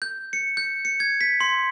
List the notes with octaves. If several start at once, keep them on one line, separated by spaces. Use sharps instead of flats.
G6
C#7
G6
C#7
G#6
B6
C6